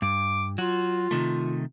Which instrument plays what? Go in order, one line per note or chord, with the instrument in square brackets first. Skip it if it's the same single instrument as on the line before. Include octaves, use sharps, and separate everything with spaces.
[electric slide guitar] G2 [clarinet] D6
[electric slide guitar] F#3 F#4 [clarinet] F4
[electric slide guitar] C3 D#3 A3